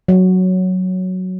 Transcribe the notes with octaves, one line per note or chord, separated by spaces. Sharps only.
F#3